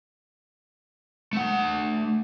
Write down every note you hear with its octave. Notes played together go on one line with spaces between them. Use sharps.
A3 F#5